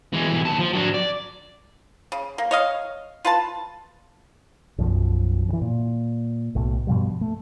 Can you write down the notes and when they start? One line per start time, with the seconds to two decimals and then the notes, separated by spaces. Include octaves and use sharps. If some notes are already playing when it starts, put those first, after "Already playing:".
0.13 E3 G#3
0.28 B1 E3
0.45 D#2 A5
0.59 F3
0.73 F#3 D4
0.94 D5
2.12 C#3
2.38 A#3
2.51 C#5 D#5 F5
3.25 F4 B4 A5
4.78 B1 F#2 F3
5.49 C#3 E3
5.61 A#2
6.55 B1 A2
6.87 G2 B2 F3 G3
7.21 A3